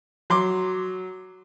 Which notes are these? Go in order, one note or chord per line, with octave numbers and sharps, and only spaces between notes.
F#3 C6 D6